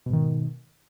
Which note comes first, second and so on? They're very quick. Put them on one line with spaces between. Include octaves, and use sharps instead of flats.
B2 G#2 D#3